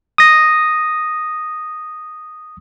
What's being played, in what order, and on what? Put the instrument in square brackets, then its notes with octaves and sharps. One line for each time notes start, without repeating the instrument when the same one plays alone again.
[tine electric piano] D#6 A#6